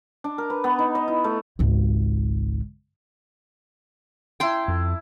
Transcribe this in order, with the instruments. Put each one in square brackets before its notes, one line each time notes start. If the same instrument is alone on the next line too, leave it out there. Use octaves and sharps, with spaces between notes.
[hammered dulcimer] D4
A#4
B4
B3
D#4
D#5
E4
A3
[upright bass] G#1 C#2
[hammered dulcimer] E4 A5 [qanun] G5 C6
[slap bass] F2